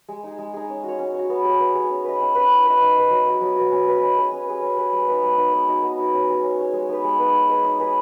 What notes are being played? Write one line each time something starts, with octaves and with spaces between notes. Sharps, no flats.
G#3
D#4 G#4
G#3
D#4 G#4
C#4
F#4 C#5
C#4
F#4 C#5
B3
G#4 C#5
B3
G#4 C#5
C#4
B4 D#5
C#4
B4 D#5
D#4
B4 D#5
D#4
B4 D#5
F#3
B3 F#4
F#3
B3 F#4
C#4
G#4 B4 D#5
C#4
G#4 B4 D#5
C#4
G#4 B4
C#4
G#4 B4
G#3
B3 D#4
G#3
B3 D#4
B3
D#4 F#4 D#5
B3
D#4 F#4 D#5
C#4
G#4 C#5
C#4
G#4 C#5
G#3
B3 D#4 B4
G#3
B3 D#4 B4
D#4
G#4 B4 D#5
D#4
G#4 B4 D#5